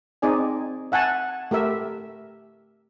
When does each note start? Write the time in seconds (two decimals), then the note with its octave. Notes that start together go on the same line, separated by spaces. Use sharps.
0.22 C4 D#4 G#4 D5 G#5
0.92 E5 F#5 G#5 A5
1.51 A3 G4 A#4 E5